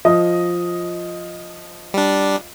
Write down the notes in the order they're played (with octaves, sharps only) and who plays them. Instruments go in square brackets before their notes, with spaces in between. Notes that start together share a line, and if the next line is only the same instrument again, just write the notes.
[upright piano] F3 D#5 D#6
[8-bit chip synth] G3 D4